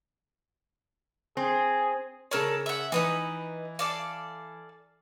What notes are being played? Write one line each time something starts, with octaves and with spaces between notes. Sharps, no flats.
C4 G#4
C#3 A4 A#4 C#5 D5
E5 F#5
E3 D#4 B4 D#5
A4 D5 F5